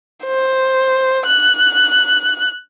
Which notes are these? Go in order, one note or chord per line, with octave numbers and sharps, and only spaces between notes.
C5
F#6